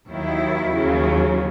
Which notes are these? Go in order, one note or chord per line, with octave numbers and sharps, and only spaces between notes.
D#2 D#3 F#3 E4
D#2 C#3 F#3 C#4